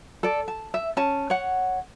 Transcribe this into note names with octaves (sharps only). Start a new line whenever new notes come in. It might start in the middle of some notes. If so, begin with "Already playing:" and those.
A4 D5
A5
E5
C#4 A5
C#5 F#5